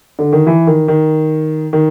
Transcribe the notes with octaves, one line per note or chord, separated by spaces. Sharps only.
D3
D#3
E3
D#3
D#3
D#3